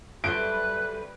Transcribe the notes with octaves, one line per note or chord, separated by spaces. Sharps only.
F#2 G3 A3 B4 C5 F#6 D7